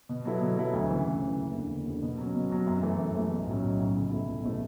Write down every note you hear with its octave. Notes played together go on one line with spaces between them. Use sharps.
B2
F#3 B3 E4 A4
B2
F#3 B3 E4 A4
D2
C#3 E3
D2
C#3 E3
F#1
E2 D3
F#1
E2 D3
B2
F#3 C#4
B2
F#3 C#4
F#2
E3 A3
F#2
E3 A3
B1
A2 F#3 C#4
B1
A2 F#3 C#4
C#2
B2 A3 E4
C#2
B2 A3 E4